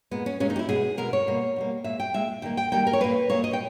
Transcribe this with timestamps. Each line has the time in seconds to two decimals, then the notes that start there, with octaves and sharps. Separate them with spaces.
0.11 A#2 G#3 B3
0.26 C#4
0.40 A#2 G#3 C#4
0.50 D#4
0.56 G4
0.59 E4
0.69 B2 G#3 G#4
0.97 B2 G#3 A#4
1.13 C#5
1.27 B2 G3 A#3
1.56 B2 G3 A#3
1.84 A#2 G#3 E5
2.00 G5
2.14 A#2 G#3 E5
2.42 D#3 G3 A#3 G5
2.57 G5
2.72 D#3 G3 A#3 G5
2.87 A#4
2.93 C#5
3.00 A#2 A#3 B4
3.30 A#2 A#3 C#5
3.44 D#5
3.53 G5